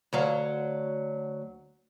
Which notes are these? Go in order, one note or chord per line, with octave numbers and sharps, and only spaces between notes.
D2 F#3 F5